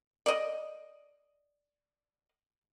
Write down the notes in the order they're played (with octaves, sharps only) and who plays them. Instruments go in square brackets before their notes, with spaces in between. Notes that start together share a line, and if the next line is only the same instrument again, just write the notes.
[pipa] D5 D#5